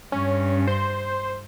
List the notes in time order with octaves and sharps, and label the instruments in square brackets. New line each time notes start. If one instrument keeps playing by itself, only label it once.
[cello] G2 [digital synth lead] C#4
[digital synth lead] C5